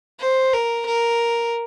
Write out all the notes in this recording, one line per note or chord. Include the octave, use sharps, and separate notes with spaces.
C5
A#4
A#4